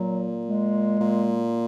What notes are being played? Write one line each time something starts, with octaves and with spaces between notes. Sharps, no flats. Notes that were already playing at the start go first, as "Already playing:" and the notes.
Already playing: A#2 F#3
G#3
A#2